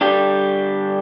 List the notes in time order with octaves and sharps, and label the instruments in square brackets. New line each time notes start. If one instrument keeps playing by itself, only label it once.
[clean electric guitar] D3 G3 D4 G4